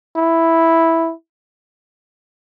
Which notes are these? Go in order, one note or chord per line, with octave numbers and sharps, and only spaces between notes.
E4